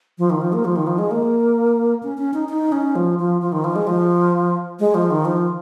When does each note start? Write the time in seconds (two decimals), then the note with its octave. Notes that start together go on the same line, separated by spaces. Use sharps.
0.18 F3
0.30 D#3
0.41 F3
0.53 A#3
0.65 F3
0.76 D#3
0.87 F3
0.99 G#3
1.11 A#3
2.03 C#4
2.18 C#4
2.34 D#4
2.49 D#4
2.72 C#4
2.96 F3
3.19 F3
3.41 F3
3.52 D#3
3.64 F3
3.76 G#3
3.87 F3
4.80 G#3
4.95 F3
5.10 D#3
5.25 F3